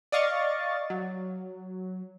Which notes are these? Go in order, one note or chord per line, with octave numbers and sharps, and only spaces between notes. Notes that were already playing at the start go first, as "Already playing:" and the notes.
D5 D#5 F5 C#6 A6
F#3